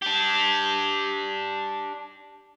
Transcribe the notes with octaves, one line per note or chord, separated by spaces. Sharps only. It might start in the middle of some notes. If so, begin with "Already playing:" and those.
D4 G4